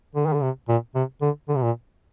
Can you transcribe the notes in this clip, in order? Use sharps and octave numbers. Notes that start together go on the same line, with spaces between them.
D3
D#3
D3
C3
A#2
C3
D3
D3
C3
A#2